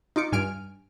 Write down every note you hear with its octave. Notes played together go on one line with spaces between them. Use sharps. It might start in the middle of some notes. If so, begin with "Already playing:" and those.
D#4 F4 D6 C#7
G2 G#5 F6 D7